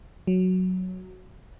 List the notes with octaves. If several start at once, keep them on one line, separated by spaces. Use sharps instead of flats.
F#3